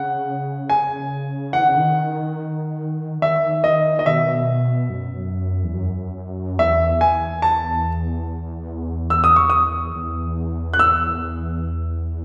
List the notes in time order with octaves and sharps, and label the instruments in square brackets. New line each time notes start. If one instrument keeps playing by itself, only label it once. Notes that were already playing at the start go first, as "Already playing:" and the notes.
Already playing: [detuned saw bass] C#3 [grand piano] F#5
[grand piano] G#5
[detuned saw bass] E3 [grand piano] F#5
[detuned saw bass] D#3
C#3
D#3
[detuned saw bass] D#3 [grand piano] E5
[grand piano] D#5
D#5
[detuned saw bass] B2 [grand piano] E5
[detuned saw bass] F#2
E2
F#2
[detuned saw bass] E2 [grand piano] E5
[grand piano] G#5
A5
E6
D#6
C#6
D#6
[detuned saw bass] E2
[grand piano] F#6
E6